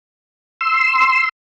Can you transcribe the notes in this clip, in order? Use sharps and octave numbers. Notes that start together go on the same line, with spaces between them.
C6 E6